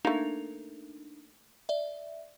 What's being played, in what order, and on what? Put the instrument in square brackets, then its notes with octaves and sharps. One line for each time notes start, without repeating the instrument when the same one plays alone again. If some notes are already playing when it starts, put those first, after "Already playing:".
[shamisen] A3 A#3 [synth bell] D4 D#4 F7
[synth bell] D5 E5